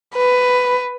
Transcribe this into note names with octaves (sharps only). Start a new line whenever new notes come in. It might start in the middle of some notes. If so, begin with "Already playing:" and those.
B4